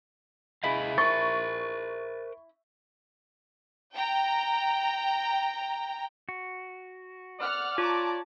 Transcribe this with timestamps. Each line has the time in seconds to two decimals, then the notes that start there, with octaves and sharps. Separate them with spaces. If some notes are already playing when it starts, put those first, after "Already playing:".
0.64 E4 G#4 D#5 F5
0.98 A#4 C5 C#6 A6
3.95 G5 A#5
6.29 F#4
7.40 D5 F#5 F6
7.78 F4 C#5 A5 A#5 D6